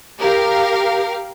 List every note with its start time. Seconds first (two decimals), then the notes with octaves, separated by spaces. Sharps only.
0.21 G4 A#4 F5